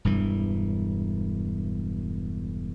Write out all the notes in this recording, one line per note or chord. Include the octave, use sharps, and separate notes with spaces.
E1 G2 E3